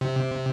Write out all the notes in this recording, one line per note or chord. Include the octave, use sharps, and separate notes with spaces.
C3